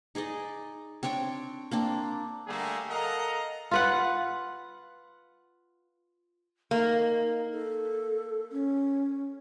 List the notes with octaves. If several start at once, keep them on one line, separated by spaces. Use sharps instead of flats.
D#4 G#4 D5 D#5
C4 D4 C#5 G5
A#3 C4 D4
D3 G3 A3 A#3 G#4
A4 A#4 D#5 F5 F#5 A#5
F4 B4 F#5
A#3 D#4
A4
C#4